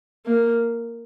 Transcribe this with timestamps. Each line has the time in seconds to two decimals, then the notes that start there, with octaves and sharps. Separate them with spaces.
0.26 A#3